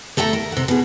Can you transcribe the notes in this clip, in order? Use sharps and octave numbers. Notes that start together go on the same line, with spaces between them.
A3 A4 E5 G5 A#5
A#4
C3 F#5
B2 G#4